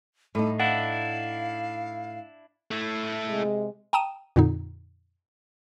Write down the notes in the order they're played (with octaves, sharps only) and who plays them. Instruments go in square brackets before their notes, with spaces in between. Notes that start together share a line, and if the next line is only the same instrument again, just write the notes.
[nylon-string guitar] A2 D#4 [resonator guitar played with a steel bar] G3 [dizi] A4
[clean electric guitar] D4 E4 [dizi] F5 [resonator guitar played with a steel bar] F#5
[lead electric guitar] A3 E4
[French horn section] C3 G#3
[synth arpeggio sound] G5 A5 A#5 D#6 D#7 E7
F2 A#2 D3 D#4